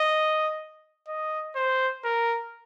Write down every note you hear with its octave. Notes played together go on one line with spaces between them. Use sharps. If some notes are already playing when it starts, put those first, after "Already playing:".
Already playing: D#5
D#5
C5
A#4